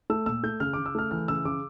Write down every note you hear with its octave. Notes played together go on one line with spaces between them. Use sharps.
A3 E6
A#2 E6
A3 G6
C#3 F6
D6
C#3
E6
A3 F6
E3 F6
C#3 E6
C#3 D6